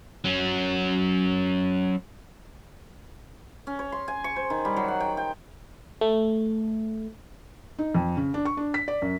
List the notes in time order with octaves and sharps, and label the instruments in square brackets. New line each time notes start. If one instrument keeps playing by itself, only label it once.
[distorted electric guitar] F#3 C#4
[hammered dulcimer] C#4
C#5
C6
G#5
C#6
C5
D#3
G3
F#3
F#5
G5
G5
[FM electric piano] A3
[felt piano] D#4
F2
C#3
D4
C#6
D4
B6
D5
F#2